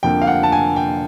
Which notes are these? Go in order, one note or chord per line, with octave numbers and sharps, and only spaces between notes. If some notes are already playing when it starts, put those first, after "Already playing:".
F2 D3 F3 A#3 G5
F5
F#5
A5
G#5
G5